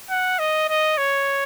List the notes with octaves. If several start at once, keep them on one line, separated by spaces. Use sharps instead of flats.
F#5
D#5
D#5
C#5